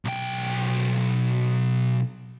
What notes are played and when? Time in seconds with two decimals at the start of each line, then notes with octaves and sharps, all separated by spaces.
0.05 B1 G5